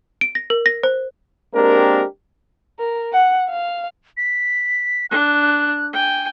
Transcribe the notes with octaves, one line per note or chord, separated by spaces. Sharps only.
D7
A#6
A#4
A#6
C5
G#3 A#3 C4 D4 G4 A#4
A#4
F#5
F5
B6
D4 F#6
G5 G#5